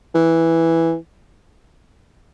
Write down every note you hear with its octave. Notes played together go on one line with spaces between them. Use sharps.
E3